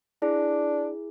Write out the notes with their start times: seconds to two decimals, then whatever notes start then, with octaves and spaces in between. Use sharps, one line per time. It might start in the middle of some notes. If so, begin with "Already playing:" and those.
0.22 D4 E4 G#4